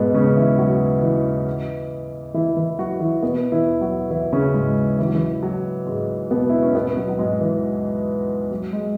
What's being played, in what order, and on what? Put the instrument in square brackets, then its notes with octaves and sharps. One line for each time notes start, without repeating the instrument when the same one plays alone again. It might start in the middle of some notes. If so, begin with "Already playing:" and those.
Already playing: [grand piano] G#2 B2 G#3 B3
C#3 C#4
E3 E4
F#3 F#4
E3 E4
E3 E4
E3 E4
F#3 F#4
E3 E4
B2 B3
E3 E4
F#3 F#4
E3 E4
C#3 C#4
G#2 G#3
E3
F#3
E3
F#3
G#2 G#3
B2 B3
E4
C#4
B2 B3
F#3
F#3
G#2 G#3
E3
F#3
G#3